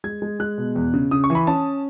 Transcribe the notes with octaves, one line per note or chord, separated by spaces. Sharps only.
G#3 G#6
G#3
G#3 F#6
B2
E2
C#3
C#3 D#6
C#6
E3
B5
C#4 A5